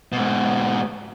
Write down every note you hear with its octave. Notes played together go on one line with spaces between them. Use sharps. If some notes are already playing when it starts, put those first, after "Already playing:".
G#2 B2